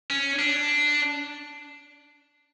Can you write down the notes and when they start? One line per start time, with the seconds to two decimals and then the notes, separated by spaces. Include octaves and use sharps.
0.10 C#4
0.39 D4